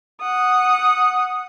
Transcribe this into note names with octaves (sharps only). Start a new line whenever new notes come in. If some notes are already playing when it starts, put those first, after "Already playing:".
F#5 D#6